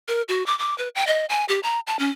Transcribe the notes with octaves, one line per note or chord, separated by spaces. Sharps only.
A#4
F#4
D6
D6
B4
G5
D#5
G#5
G4
A#5
A5
C#4